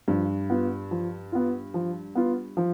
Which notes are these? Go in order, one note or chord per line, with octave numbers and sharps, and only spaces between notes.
G2 F3
B3 F4
F3
B3 F4
F3
B3 F4
F3